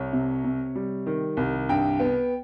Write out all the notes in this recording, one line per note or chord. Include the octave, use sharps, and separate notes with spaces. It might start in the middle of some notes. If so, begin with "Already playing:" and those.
Already playing: C2 C#5
C3
C3
G3
D#3
C2
G2 G5
B3